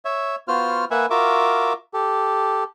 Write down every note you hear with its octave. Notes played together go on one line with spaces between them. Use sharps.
C#5 E5
B3 F4 F#4 C5 F6
A#3 B4 E5 F#5 G#5
F4 F#4 A#4 E5 D6
G4 A4